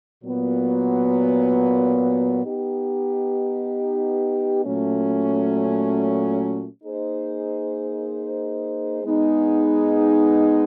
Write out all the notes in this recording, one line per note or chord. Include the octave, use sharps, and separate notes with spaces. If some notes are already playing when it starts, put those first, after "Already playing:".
A#2 F#3 B3
B3 D#4 G4
A#2 F#3 A3 C#4
A#3 D#4 G#4 C5
G#3 B3 D#4 G#4